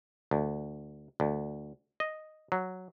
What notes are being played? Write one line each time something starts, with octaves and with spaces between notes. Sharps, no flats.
D2
D2
D#5
F#3